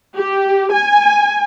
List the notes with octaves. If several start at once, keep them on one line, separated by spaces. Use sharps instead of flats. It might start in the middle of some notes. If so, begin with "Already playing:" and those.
G4
G#5